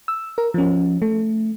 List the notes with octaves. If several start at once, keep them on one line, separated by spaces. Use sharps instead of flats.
E6
A#4
F3 C#4
A3